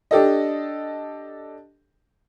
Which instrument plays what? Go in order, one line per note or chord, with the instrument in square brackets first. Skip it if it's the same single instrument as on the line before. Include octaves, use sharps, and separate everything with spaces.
[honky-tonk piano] D4 G4 A4 D#5